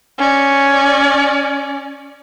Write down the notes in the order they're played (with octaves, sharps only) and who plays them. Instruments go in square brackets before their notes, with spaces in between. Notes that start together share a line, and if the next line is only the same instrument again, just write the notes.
[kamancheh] C#4 D5